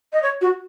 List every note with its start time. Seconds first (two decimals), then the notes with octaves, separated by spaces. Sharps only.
0.13 D#5
0.23 C#5
0.41 F#4